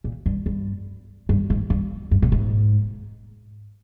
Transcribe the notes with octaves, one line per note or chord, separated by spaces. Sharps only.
A#2
G2
G2
G2
G#2
G2
G2
A#2
G#2